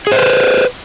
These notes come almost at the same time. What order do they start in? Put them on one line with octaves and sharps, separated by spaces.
G#4 C5 B4